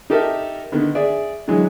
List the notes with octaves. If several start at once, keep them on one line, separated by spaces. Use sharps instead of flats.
D#4 G4 A4 A#4 E5
D3 D#3 B3
G#4 D5 E5
D3 E3 F#3 G#3